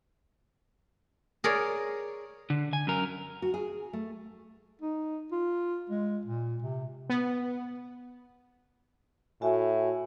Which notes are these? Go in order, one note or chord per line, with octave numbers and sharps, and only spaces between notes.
G#4 A#4 C#5 D5
D3
G#5
F#2 A#4
F#4
G#4
A3
D#4
F4
G#3
A#2
C3
B3
A2 F#4 E5 G#5